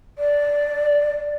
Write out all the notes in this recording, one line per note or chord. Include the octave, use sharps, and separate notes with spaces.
D5